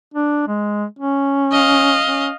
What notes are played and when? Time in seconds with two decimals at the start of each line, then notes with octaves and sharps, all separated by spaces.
0.14 D4
0.48 G#3
0.99 C#4
1.52 D#5 F5
2.06 C#4